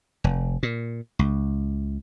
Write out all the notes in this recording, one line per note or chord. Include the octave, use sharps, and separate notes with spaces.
F1
A#2
C#2